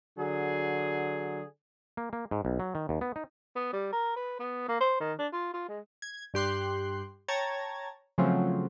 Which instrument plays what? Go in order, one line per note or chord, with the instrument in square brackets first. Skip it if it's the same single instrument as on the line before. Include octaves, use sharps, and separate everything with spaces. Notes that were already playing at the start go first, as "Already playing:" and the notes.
[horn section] D3 F#3 G#4
[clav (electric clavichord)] A#3
A#3
G#2
B1
F#3
D#3
D#2
B3
D#4
[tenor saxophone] B3
G3
A#4
B4
B3
A#3
C5
D#3
D4
F4
F4
G#3
[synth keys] G#6
G2 G4 C6 F#6
C#5 G5 A5 A#5 G#6 A6
C#3 F3 F#3 A3 C4 F4